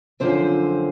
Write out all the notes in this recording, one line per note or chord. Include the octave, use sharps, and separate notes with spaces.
F#2 D3 F3 C4 C5